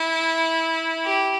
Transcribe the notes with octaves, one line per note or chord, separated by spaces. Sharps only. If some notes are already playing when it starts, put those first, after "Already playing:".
Already playing: E4
G4